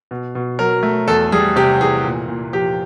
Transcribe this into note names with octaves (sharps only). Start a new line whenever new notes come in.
B2
B2
F#3 A#4
A3
E2 A4
G3 G#4
C3 G4
E3 G#4
A#2
A#2
F3 G4